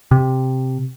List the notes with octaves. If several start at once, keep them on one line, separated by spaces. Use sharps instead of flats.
C3